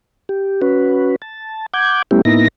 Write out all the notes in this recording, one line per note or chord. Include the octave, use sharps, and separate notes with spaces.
G4
C#4 F#4 B4
A5
F#5 D6 G6 G#6
G3 A3 B3 C#4 E4 G4
A2 A#3 B3 D#4 E4 A#6